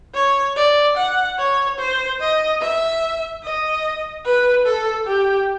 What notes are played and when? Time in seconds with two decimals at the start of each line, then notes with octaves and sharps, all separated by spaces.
0.15 C#5
0.56 D5
0.97 F#5
1.38 C#5
1.79 C5
2.21 D#5
2.62 E5
3.43 D#5
4.25 B4
4.66 A4
5.07 G4